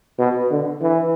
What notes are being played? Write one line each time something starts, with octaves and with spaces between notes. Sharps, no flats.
B2
D3
E3